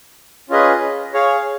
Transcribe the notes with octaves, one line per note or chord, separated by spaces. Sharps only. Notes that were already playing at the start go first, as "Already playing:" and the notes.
C#4 F4 G#4 B4 D#5
G#4 C#5 F5